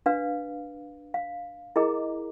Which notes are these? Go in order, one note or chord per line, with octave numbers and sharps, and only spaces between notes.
D4 B4 F5
F5
E4 G#4 A#4 D#5 A#5 D6